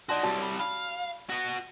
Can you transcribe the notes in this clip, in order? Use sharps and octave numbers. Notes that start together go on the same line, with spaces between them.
D#4 F#4 D5 A5 C6
C2 G3 F#4 C#5 A5
C#5 B5
F5 B5
B3 F#4